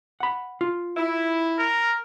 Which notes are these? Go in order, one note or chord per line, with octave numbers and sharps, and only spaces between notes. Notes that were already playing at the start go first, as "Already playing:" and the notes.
F#5 B5
F4
E4
A#4